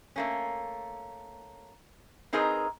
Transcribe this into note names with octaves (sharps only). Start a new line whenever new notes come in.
A3 A#3 C#4
C4 D#4 G#4 A#4 B4 D#5